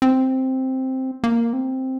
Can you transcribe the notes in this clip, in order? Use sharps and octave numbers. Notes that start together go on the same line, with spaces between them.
C4
A#3
C4